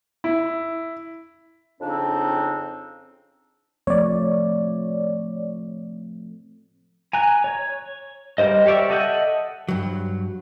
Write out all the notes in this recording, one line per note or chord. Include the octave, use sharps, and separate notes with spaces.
E4
F2 C#3 C4 D4 D#4
F3 A3 C4 C#5 D5
G#5 A#5 F#6
C#5
G3 G4 A#4 C5 D#5
G4 C#5 D5 E5
A4 D#5 E5 F#5 G6
G2 F#3